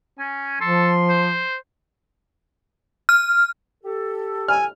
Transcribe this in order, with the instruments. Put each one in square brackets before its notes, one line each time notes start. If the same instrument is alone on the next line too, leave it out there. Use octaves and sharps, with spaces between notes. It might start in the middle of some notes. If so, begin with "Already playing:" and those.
[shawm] C#4 [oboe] G#5
[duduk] F3 [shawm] A4 [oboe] C6
[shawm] C5
[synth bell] F6
[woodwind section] G4 A4
[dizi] G#5 [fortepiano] F6